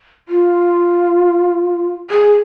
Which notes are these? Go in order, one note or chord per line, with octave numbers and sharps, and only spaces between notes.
F4
G#4